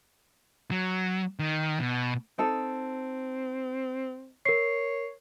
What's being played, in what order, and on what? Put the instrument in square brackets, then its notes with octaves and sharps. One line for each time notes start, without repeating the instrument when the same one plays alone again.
[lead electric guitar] F#3
D#3
B2
[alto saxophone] C4 [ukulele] D#4 A4
[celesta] A#4 C7 [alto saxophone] C#5